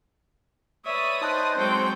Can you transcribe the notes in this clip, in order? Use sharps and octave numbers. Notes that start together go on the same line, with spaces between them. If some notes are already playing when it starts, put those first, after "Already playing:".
B4 C#5 D5 E5 D#6
D#4 C5 D#5 G5 A5 F#6
F#3 G#3 C4 A4 G5